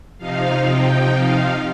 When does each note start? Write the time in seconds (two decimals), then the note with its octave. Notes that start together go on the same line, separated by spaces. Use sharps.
0.18 C3 F3 D#4 F5
0.64 G5
1.10 F5